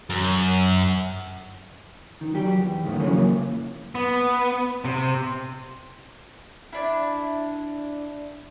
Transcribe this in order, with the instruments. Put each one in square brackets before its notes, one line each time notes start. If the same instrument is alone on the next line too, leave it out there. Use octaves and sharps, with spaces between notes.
[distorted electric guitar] F#2
[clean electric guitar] D#3
F#3 G4
E2
D2 G#2 D#3 A3
F2 C#3 E3 F#3 A#3 C#4
[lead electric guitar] B3
C3
[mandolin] D4 E4